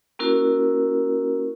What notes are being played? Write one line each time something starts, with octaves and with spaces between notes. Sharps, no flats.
A#3 C#4 E4 F#4 A#4